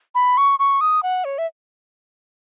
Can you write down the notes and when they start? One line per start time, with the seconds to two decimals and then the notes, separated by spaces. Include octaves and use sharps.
0.15 B5
0.37 C#6
0.59 C#6
0.81 D#6
1.03 F#5
1.25 C#5
1.38 E5